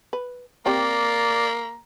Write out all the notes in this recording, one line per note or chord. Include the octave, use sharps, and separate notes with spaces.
B4
A#3 C4 G4 D5 G5 A#5